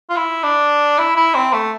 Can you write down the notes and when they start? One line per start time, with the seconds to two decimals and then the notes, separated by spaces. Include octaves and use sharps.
0.10 F4
0.16 E4
0.43 D4
0.98 E4
1.16 E4
1.35 C4
1.53 A3